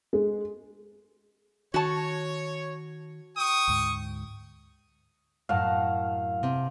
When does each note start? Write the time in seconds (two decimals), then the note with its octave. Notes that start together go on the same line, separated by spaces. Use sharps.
0.13 G#3
1.74 D#3 F#4 C#5 A5
3.37 G5 C#6 D#6
3.68 D2 G#2
5.49 F#2 A2 F5 F#5 A5
6.43 C3